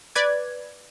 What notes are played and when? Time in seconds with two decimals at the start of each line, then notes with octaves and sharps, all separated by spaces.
0.16 B4 D5 G#6